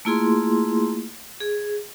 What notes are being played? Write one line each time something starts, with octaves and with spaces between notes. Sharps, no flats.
A3 A#3 E4 F4 G#4 C6
G#4